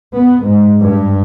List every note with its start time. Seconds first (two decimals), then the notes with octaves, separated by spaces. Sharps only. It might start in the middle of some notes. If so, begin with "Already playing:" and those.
0.14 B3
0.43 G#2
0.79 G2